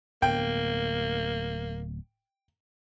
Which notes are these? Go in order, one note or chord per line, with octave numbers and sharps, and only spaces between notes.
D1 A#3 B3 G5